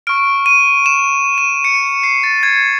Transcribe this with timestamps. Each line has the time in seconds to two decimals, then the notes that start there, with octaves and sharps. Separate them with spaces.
0.07 C#6 F6 D7
0.46 D#7
0.86 E7
1.38 D#7
1.64 C#7
2.03 C7
2.24 A6
2.43 G#6